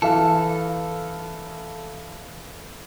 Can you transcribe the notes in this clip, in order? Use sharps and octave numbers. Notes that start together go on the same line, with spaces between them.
E3 A4 F5